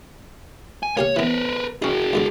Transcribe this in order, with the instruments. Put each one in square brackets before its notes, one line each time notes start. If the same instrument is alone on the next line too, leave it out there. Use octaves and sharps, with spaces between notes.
[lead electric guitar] G#5
[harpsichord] A#3 G4 F5 [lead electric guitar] C#5
[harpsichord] E3 B3 [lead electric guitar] A#4 B4
[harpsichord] C#4 D#4 [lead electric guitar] F#4 G#4
[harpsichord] D#2 G#2 D3